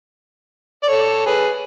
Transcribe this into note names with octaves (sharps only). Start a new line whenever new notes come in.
D5
A4 C#5
G#4 B4